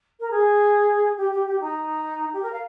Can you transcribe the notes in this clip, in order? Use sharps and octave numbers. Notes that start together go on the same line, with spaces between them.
A#4
G#4
G4
G4
G4
D#4
G4
A#4
F5